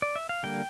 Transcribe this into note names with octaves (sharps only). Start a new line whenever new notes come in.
D5
E5
F5
D3 G3 A#3 G5